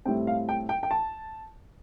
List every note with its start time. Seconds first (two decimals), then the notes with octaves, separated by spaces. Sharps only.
0.06 A2 G3 C4 G5
0.27 F5
0.49 G5
0.69 G5
0.83 G5
0.91 A5